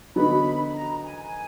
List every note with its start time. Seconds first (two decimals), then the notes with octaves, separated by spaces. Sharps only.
0.16 D3 F#3 B3 D#4 F#4 B5
0.75 A#5
1.04 G#5